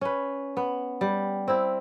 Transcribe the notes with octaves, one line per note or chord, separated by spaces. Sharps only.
C#4 B4
B3
G3
C4 E4